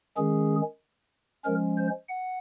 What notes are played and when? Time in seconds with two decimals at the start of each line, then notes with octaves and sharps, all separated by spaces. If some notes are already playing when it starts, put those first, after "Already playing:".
0.17 D#3 G#3 C#4 G#4
1.44 F3 G#3 C#4 A#4
1.77 C5
2.09 F#5